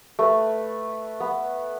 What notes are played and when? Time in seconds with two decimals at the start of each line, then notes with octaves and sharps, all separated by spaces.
0.19 A3 B4
1.20 B3